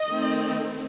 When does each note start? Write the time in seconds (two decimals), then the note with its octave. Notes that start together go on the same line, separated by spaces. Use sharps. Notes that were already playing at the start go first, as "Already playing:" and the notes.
Already playing: D#5
0.11 D#3 A3 C4